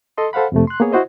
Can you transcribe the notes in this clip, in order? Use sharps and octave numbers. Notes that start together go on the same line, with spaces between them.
A4 D#5 C6
A4 C5 F5 F#5 B5
F2 C3 A3
C6 F#6
A#3 B3 G#4 C#5
E4 F#4 C5 D#5